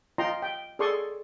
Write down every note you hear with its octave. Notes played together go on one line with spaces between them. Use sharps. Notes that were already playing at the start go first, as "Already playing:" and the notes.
F4 D#5 G5 A#5 C6
G5
G#4 A4 D5 C6 C#6 D#6